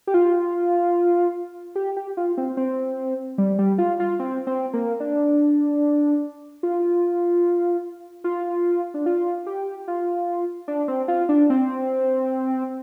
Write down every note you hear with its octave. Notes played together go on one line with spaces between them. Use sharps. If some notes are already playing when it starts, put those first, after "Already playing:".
G4
F4
G4
G4
F4
C4
C4
G3
G3
F4
F4
C4
C4
A#3
D4
F4
F4
D4
F4
G4
F4
D4
C4
F4
D4
C4